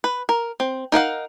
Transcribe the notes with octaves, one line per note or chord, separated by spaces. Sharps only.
B4
A#4
C4
D#4 A#4 F5 F#5